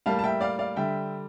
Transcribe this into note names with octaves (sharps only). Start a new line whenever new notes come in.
A2 G3 A#3 F5 A5
A5
E5 G5
D5 F5
D5 F5
D3 G3 E5 G5